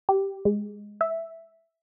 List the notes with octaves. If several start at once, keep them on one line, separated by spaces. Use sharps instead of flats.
G4
G#3
E5